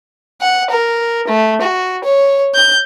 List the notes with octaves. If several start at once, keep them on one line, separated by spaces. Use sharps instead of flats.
F#5
A#4
A3
F#4
C#5
G6